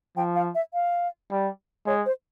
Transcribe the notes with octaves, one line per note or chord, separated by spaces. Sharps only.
F3 G5
F5
E5
F5
G3
G#3 C#5
C5